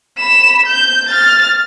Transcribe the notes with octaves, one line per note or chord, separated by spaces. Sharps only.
B5 E7
G6
F6 A6